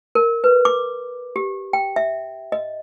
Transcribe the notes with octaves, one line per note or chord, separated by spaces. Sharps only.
A#4
B4
D6
G4
G5
E5
D#5